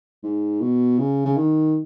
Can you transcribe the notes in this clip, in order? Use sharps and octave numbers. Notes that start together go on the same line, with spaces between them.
G#2
B2
C#3
C#3
D#3